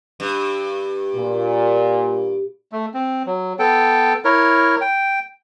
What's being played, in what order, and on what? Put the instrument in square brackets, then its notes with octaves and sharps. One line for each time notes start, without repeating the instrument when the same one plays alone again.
[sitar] G2
[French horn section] A#2
[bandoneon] A3
C4
F#3
B3 A4 G5
E4 A#4 C#5
G5